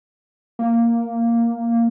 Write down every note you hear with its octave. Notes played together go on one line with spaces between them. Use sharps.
A#3